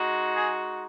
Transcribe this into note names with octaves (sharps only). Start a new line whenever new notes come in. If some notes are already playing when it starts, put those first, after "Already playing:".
Already playing: G#3 D#4 F#4
G#4